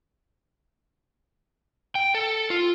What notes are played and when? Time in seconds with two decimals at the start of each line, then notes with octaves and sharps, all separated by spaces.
1.95 G5
2.15 A4
2.50 F4